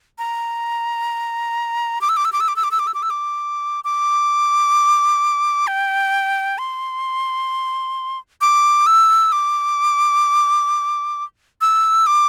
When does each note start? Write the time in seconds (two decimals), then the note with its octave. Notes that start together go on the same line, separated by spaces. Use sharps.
0.19 A#5
2.01 D6
2.09 E6
2.17 D6
2.25 E6
2.33 D6
2.40 E6
2.48 D6
2.56 E6
2.64 D6
2.71 E6
2.79 D6
2.87 E6
2.94 D6
3.03 E6
3.10 D6
3.84 D6
5.67 G5
6.58 C6
8.41 D6
8.87 E6
9.32 D6
11.61 E6
12.07 D6